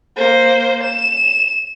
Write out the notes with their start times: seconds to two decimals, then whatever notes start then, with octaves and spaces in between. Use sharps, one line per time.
0.16 A#3 C5
0.83 E7